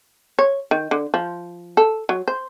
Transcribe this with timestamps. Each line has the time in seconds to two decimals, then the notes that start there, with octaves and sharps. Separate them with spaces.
0.39 C#5
0.71 D#3
0.91 D3
1.14 F3
1.77 A4
2.09 F#3
2.28 C5